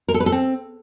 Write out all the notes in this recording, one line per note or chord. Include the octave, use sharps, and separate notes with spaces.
A#4
A4
B4
A4
C4